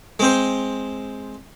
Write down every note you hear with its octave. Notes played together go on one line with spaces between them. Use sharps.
G#3 C4 C5